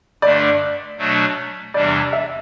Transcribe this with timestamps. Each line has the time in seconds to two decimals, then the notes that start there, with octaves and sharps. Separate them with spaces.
0.22 G2 D3 A3 D4 D5
0.98 B2 F#3 A3 D4
1.74 E2 C3 E3 G3 D4 D5
2.13 E5